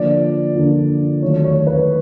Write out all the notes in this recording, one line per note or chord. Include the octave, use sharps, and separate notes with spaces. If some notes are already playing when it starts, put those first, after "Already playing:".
Already playing: D3 F3 A#3 D5
D3 F3 A#3
D#3 F#3 A3 C#5
C#5
B4